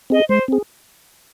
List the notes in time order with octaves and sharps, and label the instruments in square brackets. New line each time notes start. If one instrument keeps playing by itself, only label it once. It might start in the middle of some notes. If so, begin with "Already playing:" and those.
[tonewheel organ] C4 G#4 [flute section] D#5
[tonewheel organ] G#3 [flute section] C5
[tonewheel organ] C4 G#4